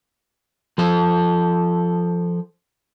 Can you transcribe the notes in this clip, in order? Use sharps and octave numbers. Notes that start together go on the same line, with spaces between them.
F3 A4